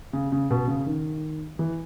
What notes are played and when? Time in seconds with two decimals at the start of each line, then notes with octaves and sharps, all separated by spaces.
0.13 C#3
0.32 C#3
0.50 B2
0.68 C#3
0.86 D#3
1.59 E3